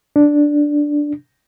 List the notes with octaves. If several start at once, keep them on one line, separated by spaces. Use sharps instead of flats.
D4